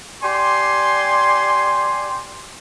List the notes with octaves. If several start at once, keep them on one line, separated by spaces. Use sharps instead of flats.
G4 D5 G#5 C6